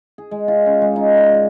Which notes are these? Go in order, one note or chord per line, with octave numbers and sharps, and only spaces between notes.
G#4
G#3
F4
C#4
G#3
D#4
D5
D5